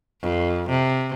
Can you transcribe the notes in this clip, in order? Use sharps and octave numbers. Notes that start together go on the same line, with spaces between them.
F2
C3